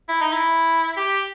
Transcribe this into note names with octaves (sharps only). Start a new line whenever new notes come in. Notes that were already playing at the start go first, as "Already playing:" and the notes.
E4
D#4
E4
G4